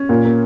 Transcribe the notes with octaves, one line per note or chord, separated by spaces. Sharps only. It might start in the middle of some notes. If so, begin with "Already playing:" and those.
Already playing: C#4
A#2
A#3